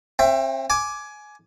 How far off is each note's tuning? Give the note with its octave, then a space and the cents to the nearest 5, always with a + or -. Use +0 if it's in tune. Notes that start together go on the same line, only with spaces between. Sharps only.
C4 +40 E5 +25 G5 +0
G#5 +15 D6 +0